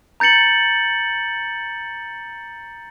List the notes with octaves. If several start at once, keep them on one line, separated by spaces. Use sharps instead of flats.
A#5 G6 A6 C#7 F#7